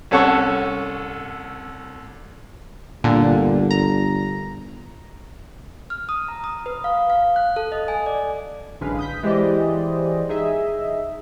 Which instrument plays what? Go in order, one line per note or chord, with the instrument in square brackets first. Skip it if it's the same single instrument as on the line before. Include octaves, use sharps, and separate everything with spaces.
[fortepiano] C2 C#4 A4 F#5 C#6
[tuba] G1 [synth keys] A#2 D3
[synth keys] A#5
[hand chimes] F6
D#6
A#5
D#6
B4
F5
F5
F#6
A4
D#5
G#5
D5
[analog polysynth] A1 F#2 D3 G#3 B4 F5
D#6 G6 B6
E3 G#3 G4 C5 D5 D#5
D#4 G#4 D#5 E5